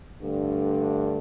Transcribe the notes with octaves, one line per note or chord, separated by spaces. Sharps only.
G2 D3 A3